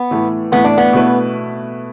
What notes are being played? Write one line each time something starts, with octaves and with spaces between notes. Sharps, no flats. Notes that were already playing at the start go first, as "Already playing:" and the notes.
Already playing: B3
A2 E3 A3
A2 E3 A3 B3
D4
B3
B2 A3 E4 B4